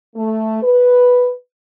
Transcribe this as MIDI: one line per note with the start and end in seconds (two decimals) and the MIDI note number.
0.16 0.59 57
0.62 1.29 71